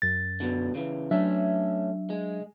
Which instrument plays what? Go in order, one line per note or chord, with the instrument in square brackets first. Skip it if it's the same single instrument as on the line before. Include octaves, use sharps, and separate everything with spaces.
[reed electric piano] F#2 A6
[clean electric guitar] B2 D3
C#3 E3
[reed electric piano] F#3 D4 E5 [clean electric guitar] A3 C#4
[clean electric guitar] G#3